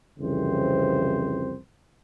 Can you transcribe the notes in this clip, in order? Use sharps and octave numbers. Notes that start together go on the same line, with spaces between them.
C2 F2 C#3 E3 C4 C5